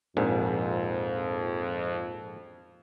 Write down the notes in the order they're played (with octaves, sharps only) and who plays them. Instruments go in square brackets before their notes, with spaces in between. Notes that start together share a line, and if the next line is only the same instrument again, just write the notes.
[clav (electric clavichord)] A#1 G#2 [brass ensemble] F2